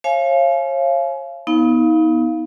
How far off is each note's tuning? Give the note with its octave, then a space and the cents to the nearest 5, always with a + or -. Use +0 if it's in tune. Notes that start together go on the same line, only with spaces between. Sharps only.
C#5 -40 F5 -25 G#5 +35
B3 -10 D#4 +35 F5 +0